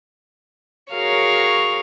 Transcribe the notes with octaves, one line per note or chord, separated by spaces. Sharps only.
F#4 G#4 A#4 C#5 F5